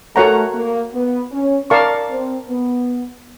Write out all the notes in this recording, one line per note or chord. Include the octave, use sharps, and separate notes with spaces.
A3 F#4 A#4 C#5 F#5 A#5
A#3
B3
C#4
A#4 D5 F5 A5 C#6
C4
B3